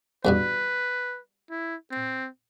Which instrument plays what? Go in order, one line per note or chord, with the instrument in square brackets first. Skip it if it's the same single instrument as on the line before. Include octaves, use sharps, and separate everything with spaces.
[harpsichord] E2 G2 B2 [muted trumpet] B4
[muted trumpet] E4
C4